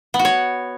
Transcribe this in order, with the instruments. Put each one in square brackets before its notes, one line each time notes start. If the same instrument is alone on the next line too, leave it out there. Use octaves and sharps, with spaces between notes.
[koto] B3
F#4
C#5